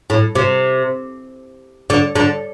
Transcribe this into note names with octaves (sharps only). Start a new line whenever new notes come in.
A2
C3
D3
D3